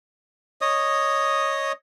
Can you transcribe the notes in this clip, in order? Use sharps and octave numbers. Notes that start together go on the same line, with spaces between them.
C#5 D#5 D#6